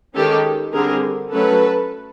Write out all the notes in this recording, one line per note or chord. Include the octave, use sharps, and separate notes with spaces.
D#3 G#3 C#4 G4 A4
D3 G3 C4 G#4 A#4
F#3 A3 C#4 A4 B4